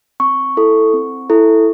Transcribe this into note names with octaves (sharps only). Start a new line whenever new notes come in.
C4 C#6
E4 A4
C4
E4 A4